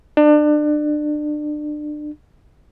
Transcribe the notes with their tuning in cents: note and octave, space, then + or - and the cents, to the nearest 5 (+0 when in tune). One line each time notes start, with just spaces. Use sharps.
D4 +30